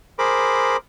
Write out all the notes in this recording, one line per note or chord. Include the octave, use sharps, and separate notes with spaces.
G#4 A#4 C5 B5 D6